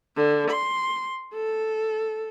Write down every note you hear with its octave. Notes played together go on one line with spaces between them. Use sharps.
D3
C6
A4